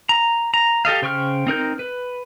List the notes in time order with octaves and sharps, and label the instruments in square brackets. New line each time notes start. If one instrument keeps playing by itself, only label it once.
[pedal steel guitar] A#5
A#5
G4 A4 D#5 F5
C#3 C5 G5 C#6 F6
C4 D#4 A#4 G6
B4